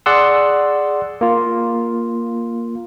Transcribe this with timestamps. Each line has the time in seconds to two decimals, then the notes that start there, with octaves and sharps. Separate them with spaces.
0.06 G#4 D5 F#5 C6 E6
1.21 A#3 F4